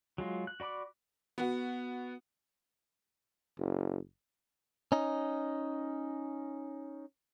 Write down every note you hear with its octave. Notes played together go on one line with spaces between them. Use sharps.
F#3 G#3 F4
F#6
F#4 D5 B5 D6
B3 F#4
F#1
C#4 D#4